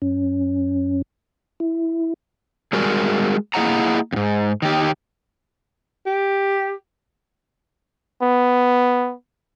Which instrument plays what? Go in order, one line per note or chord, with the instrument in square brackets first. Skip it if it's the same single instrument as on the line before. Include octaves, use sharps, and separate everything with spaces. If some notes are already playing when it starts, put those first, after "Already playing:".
[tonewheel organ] F#2 C#4
E4
[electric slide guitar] G3 G#3 F#4 A#4
A#3 E4 G#4 D#5 F#5 A#5
E2 G#2
D#3 G4
[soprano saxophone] G4
[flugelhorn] B3